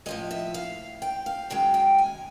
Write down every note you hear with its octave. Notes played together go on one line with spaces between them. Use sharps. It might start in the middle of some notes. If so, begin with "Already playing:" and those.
A2 F3 G#3 D#5
E5
F5
G5
F5
F#2 D#3 G#3 G5
G5
G#5